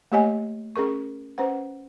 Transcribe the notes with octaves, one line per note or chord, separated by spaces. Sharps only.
A3 A#3 G4 C#5 D#5 G#5
C#4 G#4 A#4 C#6
C#4 B4 C5 F#5